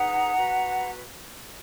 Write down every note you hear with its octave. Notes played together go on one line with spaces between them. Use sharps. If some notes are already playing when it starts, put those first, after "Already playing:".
Already playing: D#4 G#4 B4 F#5 A#5
F#4 B4